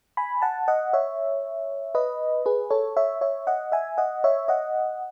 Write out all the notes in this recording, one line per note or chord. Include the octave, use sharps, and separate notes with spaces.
G#5 B5
F#5 A5
D#5 F#5
C#5 E5
B4 D#5
G#4 B4
A4 C#5
C#5 E5
C#5 E5
D#5 F#5
E5 G#5
D#5 F#5
C#5 E5
D#5 F#5